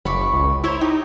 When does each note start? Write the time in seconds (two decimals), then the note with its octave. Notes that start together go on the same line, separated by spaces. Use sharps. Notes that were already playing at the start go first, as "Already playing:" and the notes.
0.05 F#1 B5 C#6 D6
0.33 C#2
0.64 E4 A#4 C5 C#5
0.81 D#4 G4